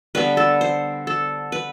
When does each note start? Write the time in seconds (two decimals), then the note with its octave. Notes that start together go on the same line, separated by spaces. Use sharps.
0.15 D3 G3 B3 B4
0.37 A4
0.61 C5
1.07 A4
1.52 B4